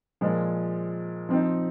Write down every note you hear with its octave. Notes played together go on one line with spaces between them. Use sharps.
A#2 F3 G#3
F3 C4 D#4